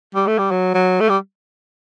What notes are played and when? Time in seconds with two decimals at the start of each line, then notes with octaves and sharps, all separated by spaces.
0.15 G3
0.27 A3
0.38 G3
0.51 F#3
0.74 F#3
1.00 A3
1.09 G3